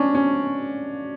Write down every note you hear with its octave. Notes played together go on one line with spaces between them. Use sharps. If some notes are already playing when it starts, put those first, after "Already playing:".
Already playing: C#4 D4
C#4